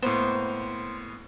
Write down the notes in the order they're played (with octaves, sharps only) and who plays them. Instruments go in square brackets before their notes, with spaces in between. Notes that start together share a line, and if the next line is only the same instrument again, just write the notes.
[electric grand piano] A2 A#3 B3 [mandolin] C5